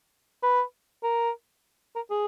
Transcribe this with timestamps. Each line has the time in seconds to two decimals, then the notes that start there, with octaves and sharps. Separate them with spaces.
0.43 B4
1.03 A#4
1.96 A#4
2.11 G#4